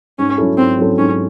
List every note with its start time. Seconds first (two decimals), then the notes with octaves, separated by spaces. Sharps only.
0.19 G#2 C#4
0.38 F#3 C#4 E4 A4
0.58 G#2 C4
0.78 F#3 C#4 E4 A4
0.98 G#2 C#4